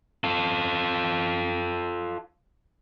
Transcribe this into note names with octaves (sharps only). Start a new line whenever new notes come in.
F4 A4